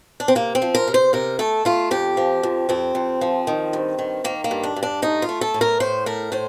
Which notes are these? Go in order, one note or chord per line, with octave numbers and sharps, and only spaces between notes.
D4
C4
C3 A#3
C4
F3
A#4
C3
C5
C3 A#4
A3 A4
A3 F4
F2 G4
F3
F2
F2 C4
F2
F3
D#3
G2
D#3
D#3 A#3
A#3
G2
D4
G2
D4
A3 D#4
F4
A3
A4
A2
A#4
A2 C5
A3 A#4
A2 C5